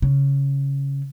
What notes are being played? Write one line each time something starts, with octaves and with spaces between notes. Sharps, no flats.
C#3